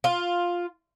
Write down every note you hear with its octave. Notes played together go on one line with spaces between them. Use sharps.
F4